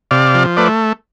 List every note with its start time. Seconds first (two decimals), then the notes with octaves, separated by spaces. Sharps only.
0.11 C3 D5 F5
0.34 F3
0.57 A3 B4 D5